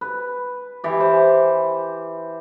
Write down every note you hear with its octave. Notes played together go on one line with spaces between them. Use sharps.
B4
E3 G4
C5